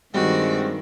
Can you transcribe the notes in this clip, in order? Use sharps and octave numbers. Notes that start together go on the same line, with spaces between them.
G2 D#3 G3 G#3 C4 F#4